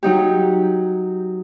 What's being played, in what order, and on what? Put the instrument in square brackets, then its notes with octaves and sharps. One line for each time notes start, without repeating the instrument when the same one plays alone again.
[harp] F#3 D#4 G4